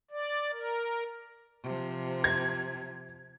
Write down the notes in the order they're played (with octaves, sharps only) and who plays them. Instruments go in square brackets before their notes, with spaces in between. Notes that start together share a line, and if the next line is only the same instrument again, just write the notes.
[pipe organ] D5
A#4
[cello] C3 F3
[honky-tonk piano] G#6